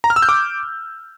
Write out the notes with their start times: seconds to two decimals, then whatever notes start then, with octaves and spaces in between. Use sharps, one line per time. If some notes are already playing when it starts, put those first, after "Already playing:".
0.04 A#5
0.10 F6
0.16 E6
0.22 G6
0.29 D6